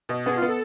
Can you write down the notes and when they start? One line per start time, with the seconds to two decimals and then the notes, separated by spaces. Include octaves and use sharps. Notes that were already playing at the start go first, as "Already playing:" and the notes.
0.09 B2
0.26 B3 G#4
0.36 F4
0.42 B3
0.48 A4